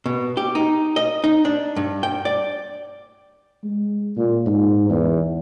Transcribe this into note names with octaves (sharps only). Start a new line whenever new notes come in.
B2
G4
D#4
D#5
D#4
D4
G2
G5
D5
G#3
A#2
G#2
E2